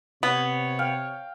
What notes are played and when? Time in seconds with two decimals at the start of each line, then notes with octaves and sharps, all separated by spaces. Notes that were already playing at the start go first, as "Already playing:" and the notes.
0.23 C3 B3 C#5
0.79 F5 G5